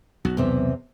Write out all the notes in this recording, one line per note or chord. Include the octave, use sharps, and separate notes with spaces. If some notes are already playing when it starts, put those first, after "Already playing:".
B1 F#4
E2 C3 E5